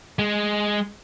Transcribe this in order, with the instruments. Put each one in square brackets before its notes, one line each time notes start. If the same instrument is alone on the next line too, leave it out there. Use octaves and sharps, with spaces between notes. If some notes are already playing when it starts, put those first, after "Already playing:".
[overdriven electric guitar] G#3